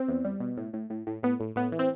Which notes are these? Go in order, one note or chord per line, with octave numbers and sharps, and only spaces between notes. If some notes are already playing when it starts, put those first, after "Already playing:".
Already playing: C4
E2
G3
B2
A2
A2
A2
A2
A2 B3
A2
A2 B3
E3
C4